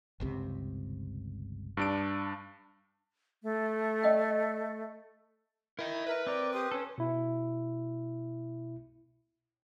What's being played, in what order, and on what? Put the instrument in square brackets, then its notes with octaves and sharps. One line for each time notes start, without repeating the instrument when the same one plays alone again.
[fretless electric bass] G1 C#2 C3
[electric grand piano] G2 D4 D7
[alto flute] A3
[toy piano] D5 D#5 G5
[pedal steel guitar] E4 [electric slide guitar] A#4 D#5
[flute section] A#4 E5 [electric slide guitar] B4
[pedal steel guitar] C4 A#4 [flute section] D5 D6
[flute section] G4 C6 D#6
[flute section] C#4 [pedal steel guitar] A4 C5
[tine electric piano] B2 E4